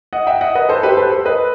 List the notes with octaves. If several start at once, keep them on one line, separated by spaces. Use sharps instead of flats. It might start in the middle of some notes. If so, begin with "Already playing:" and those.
D#5 F#5
E5 G5
D#5 F#5
B4 D#5
A4 C5
G4 B4
A4 C5
A4 C5
B4 D#5